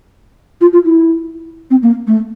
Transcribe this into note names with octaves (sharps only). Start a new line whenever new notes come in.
F4
F4
E4
C4
A#3
A3